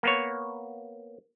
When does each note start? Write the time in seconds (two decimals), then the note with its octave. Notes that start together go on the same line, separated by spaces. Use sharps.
0.03 A#3 B3 C#5